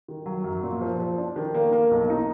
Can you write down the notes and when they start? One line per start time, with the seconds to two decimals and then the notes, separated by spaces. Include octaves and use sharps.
0.08 D#3
0.26 F#3
0.44 F#2
0.63 A#2
0.81 F3
0.99 F3
1.18 D4
1.36 D#3
1.54 A#3
1.72 A#3
1.91 B1
2.10 D#4